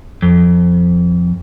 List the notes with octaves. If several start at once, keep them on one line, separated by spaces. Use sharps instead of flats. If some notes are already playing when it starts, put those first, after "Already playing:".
F2